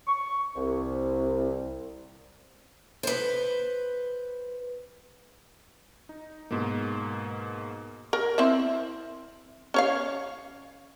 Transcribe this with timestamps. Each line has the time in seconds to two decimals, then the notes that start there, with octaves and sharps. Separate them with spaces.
0.07 C#6
0.56 C2
3.03 B4 C5
6.09 D#4
6.51 G#2 B2 A#3
8.13 A#4
8.38 C4 E4 E5
9.74 C#4 C#5 F5